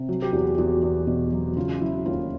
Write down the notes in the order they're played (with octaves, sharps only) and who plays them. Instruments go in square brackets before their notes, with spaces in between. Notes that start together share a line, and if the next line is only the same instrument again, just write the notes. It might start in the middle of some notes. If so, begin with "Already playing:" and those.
Already playing: [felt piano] C3
F#3
G4
E2 F#4
E2 F#4
E2
B2
F#3
C#3 F4
F#3 E4
D#2 F4